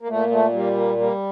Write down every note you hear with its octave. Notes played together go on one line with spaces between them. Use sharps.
A#3
A#2 A3
A3
G3 A#3
A#3
G3 A#3